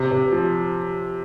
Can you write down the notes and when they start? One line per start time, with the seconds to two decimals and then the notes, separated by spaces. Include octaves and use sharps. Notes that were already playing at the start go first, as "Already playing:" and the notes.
Already playing: C3
0.11 C3
0.32 F3